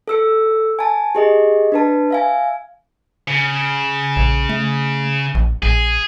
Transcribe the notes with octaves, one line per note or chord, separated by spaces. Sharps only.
A4 E6 C#7
G#5 A5
G4 G#4 D#5
D4 B4 A5
E5 F5 G#5
C#3
A#1
A3
A#1
A#1 G#4